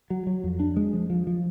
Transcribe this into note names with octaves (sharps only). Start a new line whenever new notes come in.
F#3
F#3
F2
D4
G#3
F3
F3
F3